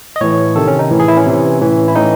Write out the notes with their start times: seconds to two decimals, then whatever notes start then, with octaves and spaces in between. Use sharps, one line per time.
0.16 D#5
0.21 A2 E3 C#5
0.56 C3 D#3 A4
0.68 C#4
0.79 D#4
0.91 A2 E3
1.00 G#4
1.08 E4
1.17 C#4
1.26 C3 E3
1.61 A2 E3
1.88 E4
1.95 A2 E3 D#4